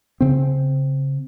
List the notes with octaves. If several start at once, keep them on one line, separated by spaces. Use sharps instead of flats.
C#3 C4